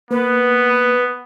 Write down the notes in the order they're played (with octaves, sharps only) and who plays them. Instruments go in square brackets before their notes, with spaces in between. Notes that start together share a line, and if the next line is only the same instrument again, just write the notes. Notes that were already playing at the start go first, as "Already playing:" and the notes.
[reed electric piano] A#3 [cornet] B3 [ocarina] B4